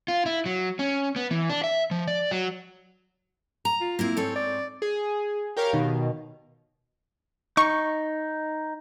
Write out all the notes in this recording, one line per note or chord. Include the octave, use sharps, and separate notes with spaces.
F4
E4
F#3
C#4
B3
E3
D4
E5
F3
D5
F#3
A#5
F4
A#3 C4 E4
G#2 C4 A4 C#5
D5
G#4
G4 A#4 C#5 F5
B2 D#3
D#4 C#6